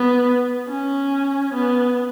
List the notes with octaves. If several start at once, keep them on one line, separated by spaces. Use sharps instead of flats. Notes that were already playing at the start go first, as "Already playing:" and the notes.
Already playing: B3
C#4
B3